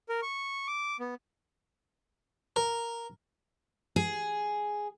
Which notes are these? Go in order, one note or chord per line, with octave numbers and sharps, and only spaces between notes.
A#4
C#6
D6
B3
A#4
G#4